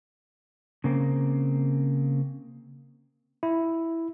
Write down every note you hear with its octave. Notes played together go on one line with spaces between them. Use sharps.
C#3 A#3 C4
E4